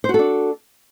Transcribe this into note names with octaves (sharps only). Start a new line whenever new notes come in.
D4 F#4 A4 C5